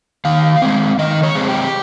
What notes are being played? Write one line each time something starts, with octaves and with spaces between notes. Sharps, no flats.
D#3 F5
G#3 C4
D#3 D#5
C#5
G#3 C4
G4